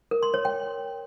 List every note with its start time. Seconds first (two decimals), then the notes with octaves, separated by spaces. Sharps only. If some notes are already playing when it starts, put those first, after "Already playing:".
0.11 A#4
0.23 C6
0.34 C#5
0.45 G5